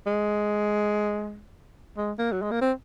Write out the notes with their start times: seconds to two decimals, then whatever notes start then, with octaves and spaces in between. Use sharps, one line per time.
0.07 G#3
1.97 G#3
2.19 A#3
2.32 F#3
2.42 G#3
2.51 A#3
2.61 C4